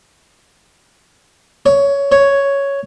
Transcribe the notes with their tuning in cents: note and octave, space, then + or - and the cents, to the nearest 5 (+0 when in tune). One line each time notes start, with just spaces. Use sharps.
C#5 +15
C#5 +5